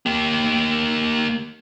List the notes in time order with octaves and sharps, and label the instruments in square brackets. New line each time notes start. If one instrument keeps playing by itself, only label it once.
[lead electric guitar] A#3 G4